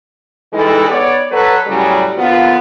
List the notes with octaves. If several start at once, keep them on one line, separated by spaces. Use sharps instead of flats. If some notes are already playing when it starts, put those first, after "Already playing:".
E3 G3 G#3 D#4 A4
B3 C#5 D5
F#3 A4 B4
A2 C#3 F#3 G3
A#2 D3 F3 B3 F4